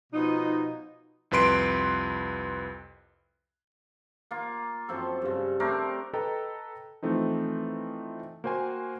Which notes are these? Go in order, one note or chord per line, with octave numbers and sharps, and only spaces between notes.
B2 F3 D#4
C2 F2 B4 C6 D7
A#3 F4
F#2 F3 C4 A4
G2 C#3
A3 C4 D4 A#4
A4 B4 D#5 G5 A#5
E3 F3 A3 C4 D#4
A#3 F#4 C5 G5 G#5